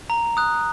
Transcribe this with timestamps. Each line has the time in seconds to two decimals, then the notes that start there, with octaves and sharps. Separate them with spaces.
0.10 A#5
0.37 D#6 F#6